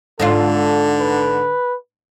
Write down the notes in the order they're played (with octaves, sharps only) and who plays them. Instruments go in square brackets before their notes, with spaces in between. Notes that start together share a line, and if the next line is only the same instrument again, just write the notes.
[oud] G#2 D4 F4 [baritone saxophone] D3 [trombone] A4
[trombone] B4